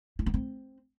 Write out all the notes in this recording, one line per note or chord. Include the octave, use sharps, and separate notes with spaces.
E4
B3
C4